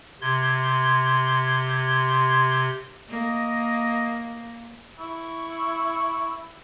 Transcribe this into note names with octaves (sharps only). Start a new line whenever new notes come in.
C3 C6 G#6
A#3 D#5
E4 C#6